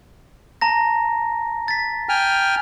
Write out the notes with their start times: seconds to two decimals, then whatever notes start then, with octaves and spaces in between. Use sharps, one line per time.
0.61 A5 A#5 A#6
1.68 A6 B6
2.09 G5 G#5 F6